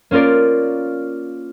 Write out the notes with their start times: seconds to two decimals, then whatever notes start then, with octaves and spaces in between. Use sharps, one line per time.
0.11 A#3 C#4 F4 A#4 D5